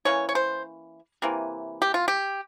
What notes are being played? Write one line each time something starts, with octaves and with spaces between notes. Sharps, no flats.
E3 A#3 C#4 C#5
C#5
C5
C3 E3 A#3
G4
F4
G4